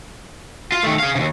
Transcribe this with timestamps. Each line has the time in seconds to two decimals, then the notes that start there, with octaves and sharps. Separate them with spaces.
0.72 F4
0.83 D#3 A3
1.00 G#4 F5
1.15 D#2 C#3